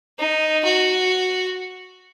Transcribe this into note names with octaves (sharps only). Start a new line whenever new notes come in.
D#4
F#4